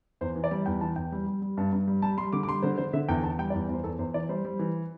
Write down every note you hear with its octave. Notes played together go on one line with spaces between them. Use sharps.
E2 C5
E3
D5
G3
E2 G5
E3 A5
E2 G5
G3
G3
G3
G2 A5
G2
G3
G3 A5
G3 C6
D3 D6
D6
G3 C6
D3 C5
D3 C5
D3 E5
E2 G5
E2 A5
G3 G5
D5
E2
E2 C5
E2 A4
E2 C5
E3 D5
G3 C5
G3
E3